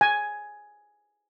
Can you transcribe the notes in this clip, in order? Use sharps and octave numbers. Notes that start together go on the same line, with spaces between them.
G#5